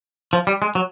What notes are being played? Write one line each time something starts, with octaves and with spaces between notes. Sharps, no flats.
F3
G3
G#3
F#3